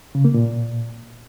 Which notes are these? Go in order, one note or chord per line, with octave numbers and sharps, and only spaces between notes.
C#3
A#3
A#2